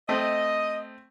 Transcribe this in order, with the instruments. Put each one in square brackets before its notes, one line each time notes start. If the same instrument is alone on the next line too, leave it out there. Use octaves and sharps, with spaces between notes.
[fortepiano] A3 C4 [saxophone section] D#5